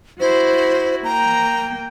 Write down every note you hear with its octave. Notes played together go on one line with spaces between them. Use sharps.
E4 F#4 C5
A#3 G5 A#5